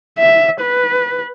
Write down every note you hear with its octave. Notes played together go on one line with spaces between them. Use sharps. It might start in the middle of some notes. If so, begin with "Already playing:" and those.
E5
B4